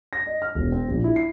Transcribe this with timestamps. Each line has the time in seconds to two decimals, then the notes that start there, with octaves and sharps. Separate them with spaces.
0.13 A#6
0.27 D#5
0.42 F6
0.55 E1
0.72 C4
0.88 A#1
1.04 E4
1.16 C7